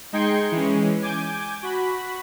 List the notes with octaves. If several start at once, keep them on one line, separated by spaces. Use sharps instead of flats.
G#3 D#4 G5 C6 G#6 C#7
E3 G#3 C#4
G#5 D6 G6
F#4 B5